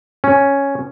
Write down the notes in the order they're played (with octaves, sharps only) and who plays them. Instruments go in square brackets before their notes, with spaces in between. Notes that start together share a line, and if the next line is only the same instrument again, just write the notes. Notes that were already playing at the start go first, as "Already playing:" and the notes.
[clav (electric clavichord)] C#4